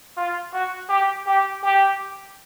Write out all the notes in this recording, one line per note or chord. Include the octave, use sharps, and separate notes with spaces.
F4
F#4
G4
G4
G4